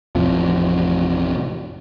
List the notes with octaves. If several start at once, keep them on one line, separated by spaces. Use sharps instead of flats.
A1 F2 C3 F3